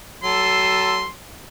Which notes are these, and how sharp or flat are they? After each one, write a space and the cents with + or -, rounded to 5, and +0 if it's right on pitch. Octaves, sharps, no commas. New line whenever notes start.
F#3 +40 A4 +0 C6 +0